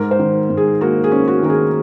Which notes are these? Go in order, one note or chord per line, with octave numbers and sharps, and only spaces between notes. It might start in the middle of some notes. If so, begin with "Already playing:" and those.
Already playing: G#2 A#4
C5
D#3
G#2
G#4
A#3 F#4
G#4
C#4
F#4
D#3 A#4
G#4